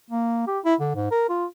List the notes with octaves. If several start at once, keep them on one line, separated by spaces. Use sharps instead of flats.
A#3
G4
E4
D3
G#2
A#4
F4